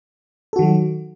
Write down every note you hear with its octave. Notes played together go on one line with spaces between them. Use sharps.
D#3 F#3 F#4 A4